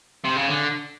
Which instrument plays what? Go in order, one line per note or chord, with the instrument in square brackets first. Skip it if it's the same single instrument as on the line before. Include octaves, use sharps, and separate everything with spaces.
[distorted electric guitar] C3
C#3
D3